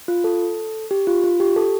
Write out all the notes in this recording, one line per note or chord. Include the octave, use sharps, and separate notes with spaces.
F4
A4
G4
F4
F4
G4
A4